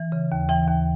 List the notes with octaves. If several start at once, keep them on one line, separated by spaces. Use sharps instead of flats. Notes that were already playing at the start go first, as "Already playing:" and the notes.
Already playing: E3
C#3
D#2
E3 G5
D#2